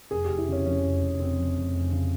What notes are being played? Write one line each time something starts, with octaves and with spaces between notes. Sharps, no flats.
F1 G#4
F1 G4
E4
C#3 C#4
F2 C#4
F1
F1
C#3 C4
F2
F1
F1
C#3